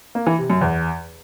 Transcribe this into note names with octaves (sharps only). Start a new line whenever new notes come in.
A#3
E3
C3
F#2
E2